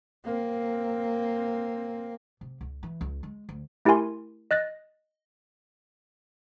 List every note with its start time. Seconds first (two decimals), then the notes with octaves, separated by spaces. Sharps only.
0.25 A#3 C4
2.41 C3
2.61 C#2
2.83 E3
3.01 C#2
3.23 G#3
3.49 D2
3.85 A3 E4 G4 A#4 G#5 C6
4.51 D#5 F#6 A6 A#6